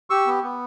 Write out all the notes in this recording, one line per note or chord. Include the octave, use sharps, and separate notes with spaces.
G4 C#6 E6
B3
B3